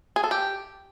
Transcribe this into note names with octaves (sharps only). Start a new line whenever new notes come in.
G#4
A4
G4